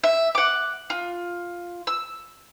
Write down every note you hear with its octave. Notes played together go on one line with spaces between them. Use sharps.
E5
F#5 D6
F4
E6